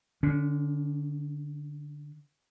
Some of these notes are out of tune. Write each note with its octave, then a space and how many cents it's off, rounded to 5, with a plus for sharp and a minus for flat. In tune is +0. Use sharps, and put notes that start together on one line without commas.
D3 +5 C#4 +35